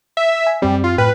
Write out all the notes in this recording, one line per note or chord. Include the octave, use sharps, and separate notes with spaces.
E5
G#5
F#2 G3 C4
F4
A2 B4 G5 F6